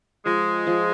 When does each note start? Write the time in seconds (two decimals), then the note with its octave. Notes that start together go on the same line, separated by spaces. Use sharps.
0.25 F3 G#3
0.67 F3